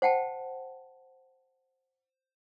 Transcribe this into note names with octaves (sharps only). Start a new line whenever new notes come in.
C5 F#5 G5 A5